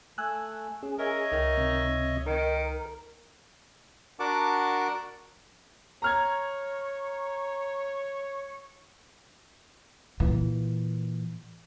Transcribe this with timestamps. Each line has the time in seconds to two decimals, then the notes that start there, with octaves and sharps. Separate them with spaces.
0.18 A3 G#5 E6 F#6
0.83 C#4 G#4
0.99 A#4 C#5 D#5 E5
1.32 C#2 D#3
1.57 C3
2.26 D#3 A#4
4.19 D4 F#4 A#4 F#5 A5 D6
6.02 C#5 A#5 F6 G#6
10.20 A#2 E3